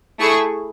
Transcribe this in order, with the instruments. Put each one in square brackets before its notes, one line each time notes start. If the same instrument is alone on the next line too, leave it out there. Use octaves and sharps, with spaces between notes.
[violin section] A3 E4 G#4 C#6